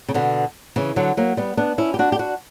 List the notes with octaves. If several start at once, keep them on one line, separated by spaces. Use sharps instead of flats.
C#3
B2 D3
C#3 E3
D3 F#3
F#3 A#3
G3 B3
B3 D4
C#4 E4
G4
D4 F#4
G4
D4 F#4